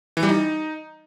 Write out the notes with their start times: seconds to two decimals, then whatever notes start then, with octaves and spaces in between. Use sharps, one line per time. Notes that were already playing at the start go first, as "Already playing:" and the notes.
0.17 E3
0.23 G3
0.29 D#4